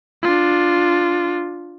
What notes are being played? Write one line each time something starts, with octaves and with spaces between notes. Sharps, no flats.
D4 F4